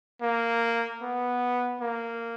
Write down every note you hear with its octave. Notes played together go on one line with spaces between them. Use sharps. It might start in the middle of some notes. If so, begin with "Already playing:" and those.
A#3
B3
A#3